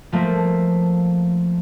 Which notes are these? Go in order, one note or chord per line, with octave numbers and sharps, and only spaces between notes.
F3 A3 A#3